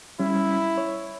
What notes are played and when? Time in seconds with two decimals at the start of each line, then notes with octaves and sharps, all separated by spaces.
0.19 G3 C#4 E4
0.78 C#5